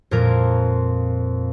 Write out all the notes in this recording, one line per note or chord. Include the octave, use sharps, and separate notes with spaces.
F2 A#2 F3 A#4